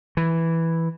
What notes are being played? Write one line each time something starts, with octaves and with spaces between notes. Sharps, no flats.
E3